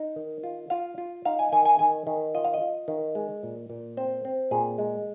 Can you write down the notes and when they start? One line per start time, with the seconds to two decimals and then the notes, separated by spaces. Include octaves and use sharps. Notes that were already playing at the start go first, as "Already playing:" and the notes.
Already playing: D#4
0.16 D#3
0.43 F4
0.70 F4 F5
0.98 F4
1.25 D#4 F5
1.39 G#5
1.52 D#3 G#5
1.65 G#5
1.79 D#3 G#5
2.07 D#3
2.34 F4 D#5
2.44 F5
2.54 D#5
2.61 F4
2.88 D#3
3.15 G#3
3.43 A#2
3.70 A#2
3.97 C4 C5
4.25 C4
4.51 A#2 G#4
4.78 G#3